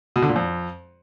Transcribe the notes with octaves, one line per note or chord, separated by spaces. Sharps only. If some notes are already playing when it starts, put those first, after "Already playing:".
B2
D3
A#2
F2